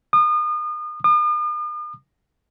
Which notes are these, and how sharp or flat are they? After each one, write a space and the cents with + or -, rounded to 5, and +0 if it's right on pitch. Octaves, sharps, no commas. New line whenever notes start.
D#6 -35
D#6 -45